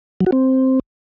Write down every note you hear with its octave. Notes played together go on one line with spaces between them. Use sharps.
F#3
F#4
C4